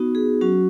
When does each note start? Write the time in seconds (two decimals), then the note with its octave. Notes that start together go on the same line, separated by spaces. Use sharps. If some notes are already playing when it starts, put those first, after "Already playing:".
Already playing: B3 D#4 F#4
0.15 G#4
0.41 F#3 C#4 F#4